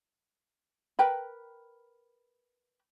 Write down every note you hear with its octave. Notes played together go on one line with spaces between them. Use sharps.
A#4 B4 G5 B5